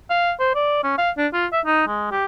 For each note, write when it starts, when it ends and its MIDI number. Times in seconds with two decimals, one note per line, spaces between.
0.10 0.32 77
0.40 0.52 72
0.55 0.80 74
0.84 0.97 61
0.98 1.10 77
1.17 1.27 62
1.33 1.46 65
1.52 1.61 76
1.66 1.87 63
1.88 2.11 56
2.11 2.25 67